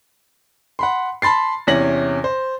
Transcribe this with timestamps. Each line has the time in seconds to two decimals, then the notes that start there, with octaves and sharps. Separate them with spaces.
0.79 F#5 B5 C6
1.22 A5 B5 C6 A6 C7
1.67 E2 C3 C#4 A#6 F#7
2.24 C5